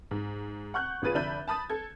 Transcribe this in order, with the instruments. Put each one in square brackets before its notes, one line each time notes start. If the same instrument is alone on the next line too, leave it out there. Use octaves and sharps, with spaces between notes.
[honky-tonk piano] G#2
F#5 C#6 F#6 G6
G#1 F4 G#4 B4 A6 D#7
F1 D3 D4 E5 B5 G6
A5 B5 D#6 A6
A4 G#6